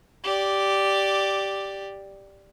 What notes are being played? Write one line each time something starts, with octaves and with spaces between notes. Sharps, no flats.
G4 D5